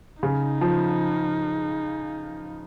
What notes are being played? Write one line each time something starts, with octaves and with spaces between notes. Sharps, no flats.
C#3 D#4
F3